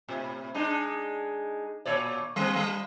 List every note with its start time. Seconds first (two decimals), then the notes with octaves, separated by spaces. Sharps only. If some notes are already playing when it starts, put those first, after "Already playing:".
0.08 A2 C3
0.55 G#3 D4 D#4
1.86 A#2 C#5 D5
2.36 G3 C4
2.56 G3